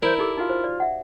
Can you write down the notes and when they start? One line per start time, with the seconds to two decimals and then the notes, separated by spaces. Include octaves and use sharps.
0.02 E4 A#4 C5 D5
0.18 D#4 G4 A4 D6
0.37 D#4 F4 F#4 F5
0.50 C5
0.64 D5
0.80 E5 F#5